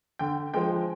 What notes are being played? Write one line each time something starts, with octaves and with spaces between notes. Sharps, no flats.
D3 G5
F3 G#3 G5